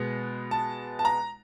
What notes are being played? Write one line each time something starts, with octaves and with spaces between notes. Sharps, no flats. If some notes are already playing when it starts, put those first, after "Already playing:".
Already playing: B2 G#3 B3
A5
A5
A#5